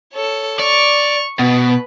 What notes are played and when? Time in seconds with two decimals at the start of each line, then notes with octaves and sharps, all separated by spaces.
0.13 A4 C#5
0.59 D5 C#6 F7
1.39 B2 B4